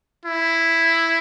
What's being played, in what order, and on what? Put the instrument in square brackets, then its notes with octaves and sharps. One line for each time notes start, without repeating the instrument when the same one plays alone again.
[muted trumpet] E4